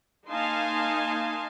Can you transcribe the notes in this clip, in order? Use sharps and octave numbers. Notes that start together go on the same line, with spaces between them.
A#3 D#4 F5 G#5 A5 C6